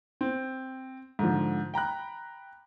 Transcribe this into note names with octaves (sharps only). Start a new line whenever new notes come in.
C4
G#2 D3 F3
G5 A#5 B5 F#6